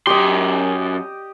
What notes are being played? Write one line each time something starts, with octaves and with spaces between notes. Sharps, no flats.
F#2 G4 D#5 C6